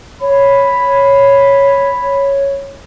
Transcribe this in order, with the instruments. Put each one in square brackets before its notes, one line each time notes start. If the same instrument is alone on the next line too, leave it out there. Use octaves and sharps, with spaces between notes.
[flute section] C#5 [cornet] B5